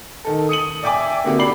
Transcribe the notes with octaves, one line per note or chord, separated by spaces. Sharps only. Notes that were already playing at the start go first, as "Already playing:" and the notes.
D#3 A4
D#6 C#7 D#7 F#7
D5 E5 G5 G#5 D6
D3 A#3 C4 E4 F#4 G4
D4 D5 B5 C7 F#7